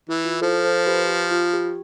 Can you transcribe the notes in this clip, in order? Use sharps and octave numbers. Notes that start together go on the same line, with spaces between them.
E3 E4
F4
F3 A4 C5
A4 C5
G4 B4
G4
F4
G4